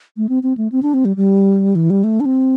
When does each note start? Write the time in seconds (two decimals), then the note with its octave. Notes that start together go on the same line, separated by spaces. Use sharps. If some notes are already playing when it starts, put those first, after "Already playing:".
0.17 A3
0.29 C4
0.43 C4
0.58 A3
0.72 C4
0.83 D4
0.94 C4
1.05 G3
1.17 G3
1.75 E3
1.90 G3
2.04 A3
2.20 D4
2.25 C4